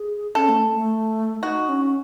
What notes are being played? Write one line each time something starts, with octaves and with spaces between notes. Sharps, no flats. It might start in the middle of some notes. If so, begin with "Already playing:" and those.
Already playing: G#4
C#4 A4
A3
A3
D#4 F#4
C#4